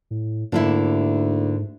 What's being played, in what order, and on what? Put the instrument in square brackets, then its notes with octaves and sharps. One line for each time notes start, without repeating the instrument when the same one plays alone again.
[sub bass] A2
[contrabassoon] D2 [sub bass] G#2 [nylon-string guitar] D3 A#3 E4